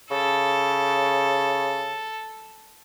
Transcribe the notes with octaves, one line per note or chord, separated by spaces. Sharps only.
C#3 A4